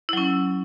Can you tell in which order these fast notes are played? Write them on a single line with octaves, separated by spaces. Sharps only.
E4 F#3 C#4